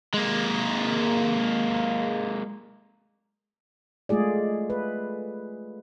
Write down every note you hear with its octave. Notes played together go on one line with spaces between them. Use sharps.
G#3 A#3
G#3 A3 F4 G#4 D5
B4